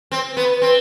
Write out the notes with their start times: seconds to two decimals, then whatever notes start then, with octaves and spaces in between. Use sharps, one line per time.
0.12 C4
0.37 B3
0.62 C4